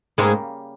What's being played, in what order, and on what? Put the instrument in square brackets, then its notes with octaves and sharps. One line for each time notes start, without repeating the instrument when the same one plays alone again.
[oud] G#2 G#3 [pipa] C#3 G3 A#3